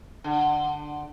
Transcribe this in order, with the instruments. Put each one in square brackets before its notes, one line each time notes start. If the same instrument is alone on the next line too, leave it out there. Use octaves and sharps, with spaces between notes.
[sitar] D3